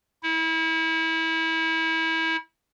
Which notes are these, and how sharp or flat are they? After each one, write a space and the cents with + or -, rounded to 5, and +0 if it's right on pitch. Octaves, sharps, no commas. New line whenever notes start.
E4 -30